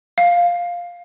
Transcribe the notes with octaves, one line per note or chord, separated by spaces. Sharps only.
F5